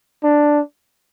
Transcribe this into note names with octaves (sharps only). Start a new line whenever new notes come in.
D4